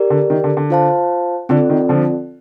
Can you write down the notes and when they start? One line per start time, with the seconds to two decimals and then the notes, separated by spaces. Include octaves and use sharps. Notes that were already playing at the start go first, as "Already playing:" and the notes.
Already playing: G4 A#4 D5
0.10 D3
0.30 D#3
0.44 D3
0.57 D3
0.70 F4 C5 F5 A5
1.49 D3 C4 F4 A4 D5
1.70 D#3
1.89 D3 F3